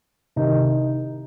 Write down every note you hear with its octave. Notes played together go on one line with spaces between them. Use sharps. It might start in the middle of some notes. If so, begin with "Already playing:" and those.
C2 C3 D#3 D#4